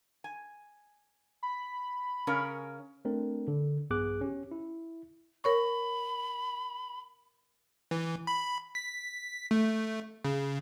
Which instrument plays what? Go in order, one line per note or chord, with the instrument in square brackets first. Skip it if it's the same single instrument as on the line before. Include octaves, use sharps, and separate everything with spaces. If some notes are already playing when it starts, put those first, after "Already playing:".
[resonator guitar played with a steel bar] G#5
[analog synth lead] B5
[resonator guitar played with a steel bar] C#3 C#4 A#4
[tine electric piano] A3 C4 D4 A#4
D3
A#1 G2 B3 G#4 D6 F#6
C#4 G4
E4
[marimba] A#4 C#5 C#6 [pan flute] B5
[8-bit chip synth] E3
B5
B6
A3
C#3